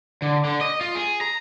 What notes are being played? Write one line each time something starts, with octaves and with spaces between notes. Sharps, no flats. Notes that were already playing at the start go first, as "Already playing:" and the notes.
D3
D3
D#5
F4
G#4
A#5